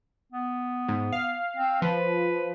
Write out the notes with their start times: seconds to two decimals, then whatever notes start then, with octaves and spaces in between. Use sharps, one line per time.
0.32 B3
0.88 G#2
1.13 F5
1.56 C4
1.82 F3 B4